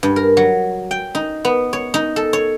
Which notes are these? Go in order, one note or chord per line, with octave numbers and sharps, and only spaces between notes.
G2
A#4
F#3
G5
D#4
B3
C#5
D#4
A4
C#5